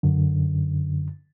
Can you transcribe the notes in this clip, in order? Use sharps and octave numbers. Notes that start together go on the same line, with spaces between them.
F#2 D3